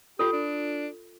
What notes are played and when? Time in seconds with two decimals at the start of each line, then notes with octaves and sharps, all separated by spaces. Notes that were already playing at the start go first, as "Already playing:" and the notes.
0.19 F4 G4 A4
0.33 D4